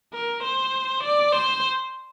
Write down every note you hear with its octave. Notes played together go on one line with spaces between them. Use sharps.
A#4
C5
D5
C5